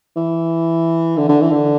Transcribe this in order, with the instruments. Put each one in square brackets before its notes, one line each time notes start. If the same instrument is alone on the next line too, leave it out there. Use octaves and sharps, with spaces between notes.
[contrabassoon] E3
D3
D3
E3
D3